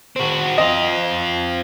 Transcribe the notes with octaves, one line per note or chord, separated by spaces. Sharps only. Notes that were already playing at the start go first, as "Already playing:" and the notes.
C4 F#4
C4 F4 D#5